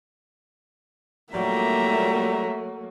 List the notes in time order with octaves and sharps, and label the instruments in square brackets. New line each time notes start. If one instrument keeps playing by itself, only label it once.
[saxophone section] A#2 G3 [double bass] F#3 [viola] A3 A#3 [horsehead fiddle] E5 A#5